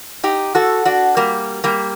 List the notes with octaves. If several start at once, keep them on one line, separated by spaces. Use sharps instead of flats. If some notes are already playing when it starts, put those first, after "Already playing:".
D#4 G4
F#4 A4
D4 F#4
G3 A#3
G3 A#3